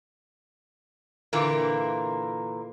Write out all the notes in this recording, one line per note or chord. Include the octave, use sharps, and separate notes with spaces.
A#2 D3 E3 A#3